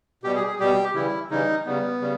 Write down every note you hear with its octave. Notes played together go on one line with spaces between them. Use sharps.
B2 G3 G4
G#4
G#4
B2 G3 G4
C#3 E3 G3 E4
C#3 E3 G3 D#4
C#3 G3 B3
C#3 G3